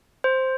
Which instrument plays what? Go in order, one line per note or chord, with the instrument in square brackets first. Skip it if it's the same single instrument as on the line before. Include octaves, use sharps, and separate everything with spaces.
[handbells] C5